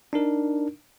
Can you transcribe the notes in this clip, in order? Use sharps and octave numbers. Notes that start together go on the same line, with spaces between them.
D4 D#4 A#4